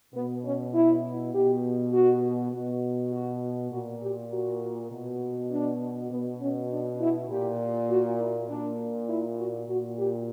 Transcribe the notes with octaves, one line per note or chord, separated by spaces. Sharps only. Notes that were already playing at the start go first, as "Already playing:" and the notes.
B2 B3
C#4
E4
B2 G4
F#4
B2 F#4
F#4
A#2 F#4
G4
F#4
B2
D4
B2 B3
C#4
D4
E4
A#2 G4
F#4
E4
A#2 D4
E4
F#4
A#2 F#4
G4